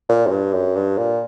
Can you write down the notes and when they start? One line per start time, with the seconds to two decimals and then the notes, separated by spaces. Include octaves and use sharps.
0.09 A#2
0.26 F#2
0.31 G2
0.53 F#2
0.76 G2
0.98 A#2